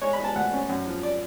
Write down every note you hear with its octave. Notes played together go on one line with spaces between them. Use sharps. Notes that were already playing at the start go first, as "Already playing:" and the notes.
G#3 C#5
B5
G#3 A5
D2 F#5
C#4
F#2
F3
D5